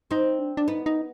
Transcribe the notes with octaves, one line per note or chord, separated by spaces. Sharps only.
C4 D#4
D4
D4
B3 D#4
D#4